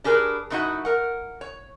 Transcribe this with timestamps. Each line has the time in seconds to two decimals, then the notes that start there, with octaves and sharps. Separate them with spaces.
0.04 D4 G4 G#4 A#4 B4
0.50 F#2 A3 D#4 E4 F#4 F#5
0.85 A#4 F#5
1.41 C#5